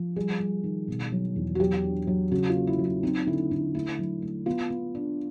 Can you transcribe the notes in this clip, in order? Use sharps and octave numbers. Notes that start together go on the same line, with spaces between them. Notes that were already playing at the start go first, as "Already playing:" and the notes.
Already playing: F3
G3 G#4
G3
D#3
B2
F#3
E2
F#4
F#3 G4
D4
F#3
C#3 F#4
F4
A#3
E4
F#3
E4
C4 D#4
D3 E4
D3 D#4
A3 E4
F#3
A3
B3 F4
B3
D4